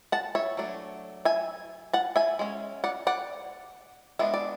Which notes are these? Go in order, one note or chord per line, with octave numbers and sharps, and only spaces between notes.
F#5 A5
C#5 E5
F#3 A3 D4
E5 G#5
F#5 A5
E5 G#5
G#3 C#4
D5 F#5
D5 F#5
G#3 B3 D4 E5
D5